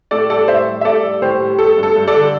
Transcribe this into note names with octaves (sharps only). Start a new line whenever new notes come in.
A2 A4 D5
G3 A4 D5
A2 C5 E5
G3
E5
A2 A4 D5
G3
A2 G4 C5
G3
A3 A4
G2
A4
G2
A4 D5
D3